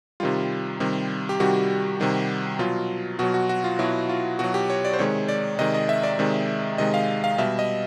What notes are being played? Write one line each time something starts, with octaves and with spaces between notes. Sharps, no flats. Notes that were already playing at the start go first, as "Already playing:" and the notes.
C3 D#3 G3 F4
C3 D#3 G3
G4
C3 D#3 G3 F#4
C3 D#3 G3
B2 F#3 F4
B2 F#3 F#4
F#4
F#4
F4
B2 F#3 E4
F4
B2 F#3 F#4
G4
C#5
D5
C5
C3 D#3 G#3 C#5
D5
C3 D#3 G#3 D#5
D#5
E5
D5
C3 D#3 G#3
C3 D#3 G#3 D#5
F5
F5
B2 G3 E5
D#5